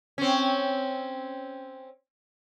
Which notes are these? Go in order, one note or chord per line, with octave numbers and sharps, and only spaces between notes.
C4 C#4